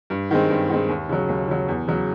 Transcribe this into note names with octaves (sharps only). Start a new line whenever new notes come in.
G2
D#3 G#3 C4
G2
D#3 G#3 C4
D#2
C#3 F#3
D#2
C#3 F#3
E2
C#3 F#3